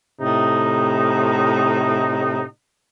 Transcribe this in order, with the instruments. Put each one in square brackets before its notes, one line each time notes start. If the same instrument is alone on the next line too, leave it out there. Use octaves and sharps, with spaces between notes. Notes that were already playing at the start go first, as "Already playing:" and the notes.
[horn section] A2 C3 D#4